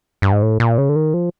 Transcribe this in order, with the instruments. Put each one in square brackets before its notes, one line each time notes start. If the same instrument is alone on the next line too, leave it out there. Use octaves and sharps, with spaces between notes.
[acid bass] G2
G#2
A2
A#2
C#3
D3
D#3
F3